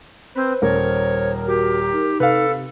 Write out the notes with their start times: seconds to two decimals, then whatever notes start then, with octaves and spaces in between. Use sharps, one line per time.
0.35 C4 B4 C5
0.62 D#1 A#4 C#5
1.47 F#4 G4
1.92 D#4
2.20 C3 A4 B4 F5